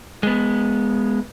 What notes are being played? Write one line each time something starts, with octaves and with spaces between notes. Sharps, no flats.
G#3 B3